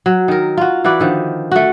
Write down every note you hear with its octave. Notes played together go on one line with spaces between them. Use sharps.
F#3
D#3 A#4
F4 F#4
E3 F#4 B4 D5
D3 D#3 F3
A3 F#4